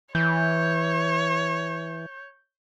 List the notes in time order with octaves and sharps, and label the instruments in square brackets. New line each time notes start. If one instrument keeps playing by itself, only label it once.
[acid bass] E3 [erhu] C#5 [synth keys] G6